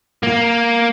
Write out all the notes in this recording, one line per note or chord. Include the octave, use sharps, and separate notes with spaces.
A#3